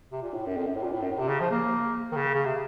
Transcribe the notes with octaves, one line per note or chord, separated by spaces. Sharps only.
C3
A#2
A2
F#2
F2
F#2
A2
A#2
A2
F#2
A2
C3
C#3
F3
A#3
D#3
C#3
C#3
C3